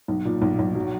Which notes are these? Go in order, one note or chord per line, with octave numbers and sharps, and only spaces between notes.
B1
A#2
B1
B1
F#3